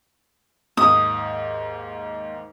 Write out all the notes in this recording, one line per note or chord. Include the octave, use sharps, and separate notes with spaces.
D#2 G#2 D#6